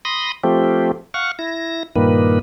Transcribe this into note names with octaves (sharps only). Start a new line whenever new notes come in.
B5 C6 D#6 A#6
F3 A3 C4 G4
F5 F#5 C#6
E4 A#6
G2 A#2 D#3 A#3 B4